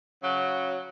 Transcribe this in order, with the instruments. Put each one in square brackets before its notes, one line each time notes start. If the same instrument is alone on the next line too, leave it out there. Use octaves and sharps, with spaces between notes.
[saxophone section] C#3 F#3